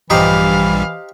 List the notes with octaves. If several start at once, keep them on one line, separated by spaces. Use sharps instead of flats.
A#1 G2 E3 G3 D#4 G4 C5 F5